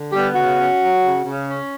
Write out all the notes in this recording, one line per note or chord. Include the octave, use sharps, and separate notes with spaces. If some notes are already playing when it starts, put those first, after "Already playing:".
Already playing: D3
G3 B3 G4
C#3 F#4
C#4
F#3
C#3
C#3
C#4